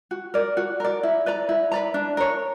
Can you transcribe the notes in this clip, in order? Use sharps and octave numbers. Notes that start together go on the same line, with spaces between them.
F#4
A#4 D5
F#4
A#4 D5
E4
B4 D5 A#5
E4
B4 D5 A#5
D4
A#4 C#5